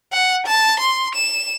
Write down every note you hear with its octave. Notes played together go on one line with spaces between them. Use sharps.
F#5
A5
C6
E7